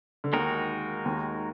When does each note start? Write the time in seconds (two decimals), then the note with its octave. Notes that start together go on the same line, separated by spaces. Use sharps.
0.24 D3
0.33 D#2 D#3 G#3 D#4 F#4 A#4
1.05 D#2 D#3